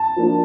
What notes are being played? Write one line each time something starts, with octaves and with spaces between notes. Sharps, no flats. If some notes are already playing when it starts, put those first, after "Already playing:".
Already playing: A5
F3 A#3 D4